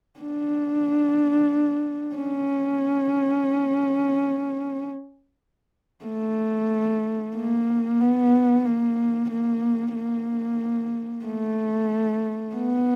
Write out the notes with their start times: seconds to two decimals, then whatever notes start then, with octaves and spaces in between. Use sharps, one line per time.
0.20 D4
2.15 C#4
6.05 A3
7.35 A#3
8.00 B3
8.65 A#3
9.30 A#3
9.95 A#3
11.25 A3
12.55 B3